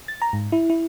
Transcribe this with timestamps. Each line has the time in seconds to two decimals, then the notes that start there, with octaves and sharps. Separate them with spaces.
0.08 A6
0.22 A#5
0.33 G#2
0.52 E4
0.70 E4